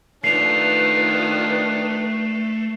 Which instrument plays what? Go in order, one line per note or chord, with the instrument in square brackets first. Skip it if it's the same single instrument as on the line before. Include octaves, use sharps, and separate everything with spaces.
[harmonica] D#3 F3 D4 [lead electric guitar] A3 [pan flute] B4 [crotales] C7 F7